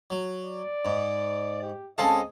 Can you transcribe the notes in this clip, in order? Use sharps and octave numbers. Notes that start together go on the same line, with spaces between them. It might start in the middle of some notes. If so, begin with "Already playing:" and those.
F#3
D5
G#2
G4
C#2 C4 G#4 A4 D#5 F5 A5